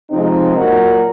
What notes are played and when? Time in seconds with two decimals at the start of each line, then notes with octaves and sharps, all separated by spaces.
0.10 C3 F3 G#3 C4 D#4
0.55 A#2 F#3 F#4 A#4